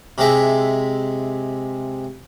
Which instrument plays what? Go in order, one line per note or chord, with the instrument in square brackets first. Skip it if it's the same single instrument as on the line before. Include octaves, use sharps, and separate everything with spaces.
[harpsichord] C3 G#3 E5